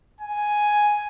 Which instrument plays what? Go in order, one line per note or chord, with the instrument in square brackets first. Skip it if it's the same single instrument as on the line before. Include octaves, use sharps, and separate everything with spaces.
[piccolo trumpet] G#5